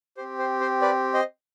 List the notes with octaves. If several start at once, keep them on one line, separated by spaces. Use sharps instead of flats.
C4 G4 C5
C5
C5
B4 D5
C5 D#5